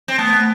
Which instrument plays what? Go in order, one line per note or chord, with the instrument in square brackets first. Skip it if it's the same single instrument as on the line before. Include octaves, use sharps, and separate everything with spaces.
[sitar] C4
[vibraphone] A3 [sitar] B3
[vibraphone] A3